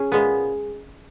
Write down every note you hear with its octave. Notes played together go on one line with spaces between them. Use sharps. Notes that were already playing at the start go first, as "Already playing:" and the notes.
Already playing: C#4 G#4
A#2 G#3 B3